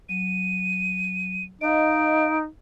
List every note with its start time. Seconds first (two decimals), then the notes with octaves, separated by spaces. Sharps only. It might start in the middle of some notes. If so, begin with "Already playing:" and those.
0.09 F#3 D#7
1.61 D#4 D#5 F5 D7